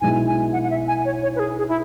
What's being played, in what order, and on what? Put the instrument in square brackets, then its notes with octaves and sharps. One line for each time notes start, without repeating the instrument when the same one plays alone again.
[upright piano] B1 B2 G#3 E4 [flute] G#5
[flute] G#5
F#5
F#5
E5
G#5
C#5
C#5
B4
G#4
G#4
E4